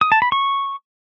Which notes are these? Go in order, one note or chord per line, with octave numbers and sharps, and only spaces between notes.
D#6
A5
B5
C#6